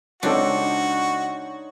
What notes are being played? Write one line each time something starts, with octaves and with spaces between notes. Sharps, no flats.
C#2 C4 D4 D#4 F#4 A4 C#5 D5